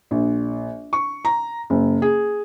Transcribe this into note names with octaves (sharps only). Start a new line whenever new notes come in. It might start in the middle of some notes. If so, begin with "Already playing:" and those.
A#1
C#6
A#5
F#1
G#4